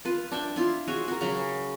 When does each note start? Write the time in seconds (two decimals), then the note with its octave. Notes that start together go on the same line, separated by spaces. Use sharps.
0.05 F4 B4
0.32 D4 E5 G5
0.56 E4 F4 C6
0.88 F#4 G#4 C#5 E5
1.08 F#4 A#4
1.21 C#3 F#3